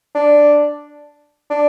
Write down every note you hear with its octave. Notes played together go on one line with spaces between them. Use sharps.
D4
D4